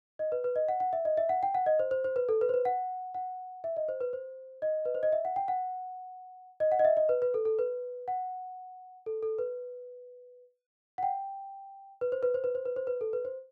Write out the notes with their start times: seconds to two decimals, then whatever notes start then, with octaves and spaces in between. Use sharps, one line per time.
0.19 D#5
0.32 B4
0.44 B4
0.56 D#5
0.69 F#5
0.80 F#5
0.93 E5
1.05 D#5
1.17 E5
1.29 F#5
1.43 G5
1.55 F#5
1.66 D#5
1.79 C5
1.91 C5
2.04 C5
2.16 B4
2.29 A4
2.41 B4
2.49 C5
2.54 B4
2.65 F#5
3.15 F#5
3.64 E5
3.77 D#5
3.89 C5
4.01 B4
4.13 C5
4.62 D#5
4.85 B4
4.95 C5
5.03 D#5
5.12 E5
5.25 F#5
5.36 G5
5.48 F#5
6.60 D#5
6.72 F#5
6.79 D#5
6.85 E5
6.97 D#5
7.09 B4
7.22 B4
7.34 A4
7.45 A4
7.59 B4
8.08 F#5
9.06 A4
9.23 A4
9.39 B4
10.98 F#5
11.03 G5
12.01 B4
12.12 C5
12.23 B4
12.34 C5
12.44 B4
12.55 C5
12.66 B4
12.76 C5
12.87 B4
13.01 A4
13.13 B4
13.25 C5